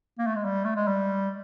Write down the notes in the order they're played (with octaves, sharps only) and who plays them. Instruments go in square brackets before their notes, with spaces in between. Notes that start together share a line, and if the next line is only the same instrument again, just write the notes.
[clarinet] A#3
A3
G#3
G3
A3
G#3
G3